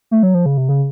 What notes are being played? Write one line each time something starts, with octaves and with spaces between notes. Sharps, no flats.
A3
F#3
F3
C#3
C3
C#3